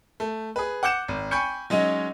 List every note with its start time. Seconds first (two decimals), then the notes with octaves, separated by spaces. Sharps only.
0.20 A3
0.56 G#4 B4
0.83 F#5 D6 G6 C#7 E7
1.08 G#1
1.31 G5 G#5 B5 C#6 G6 C#7
1.70 F#3 G#3 C#4 D#4